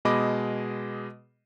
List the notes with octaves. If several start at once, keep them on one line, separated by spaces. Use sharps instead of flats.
B2 G#3 D#5 B5 D6